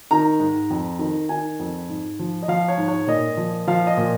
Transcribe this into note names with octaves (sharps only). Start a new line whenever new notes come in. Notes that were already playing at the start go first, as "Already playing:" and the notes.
D#3 A#5
G#2
F2
D#3
D#3 G#5
F2
G#2
F3
D#5
F3 F5
C#5
G#2
C#5
A#2 D#5
F3
F3 F5
D#5
A#2